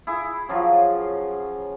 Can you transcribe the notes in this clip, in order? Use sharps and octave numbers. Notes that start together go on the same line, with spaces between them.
E4 G#4
C#3 F3 F#3 F4